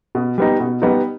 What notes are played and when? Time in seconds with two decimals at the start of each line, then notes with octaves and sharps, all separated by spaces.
0.15 B2
0.38 G3 B3 D#4
0.60 B2
0.82 G3 B3 D#4